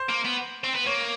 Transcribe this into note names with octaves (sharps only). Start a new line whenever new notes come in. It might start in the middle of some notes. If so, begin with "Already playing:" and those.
Already playing: C5
A#3
B3
C4
B3
A#3 C#5